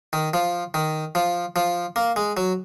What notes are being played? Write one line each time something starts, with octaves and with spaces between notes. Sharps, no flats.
D#3
F3
D#3
F3
F3
A#3
G#3
F#3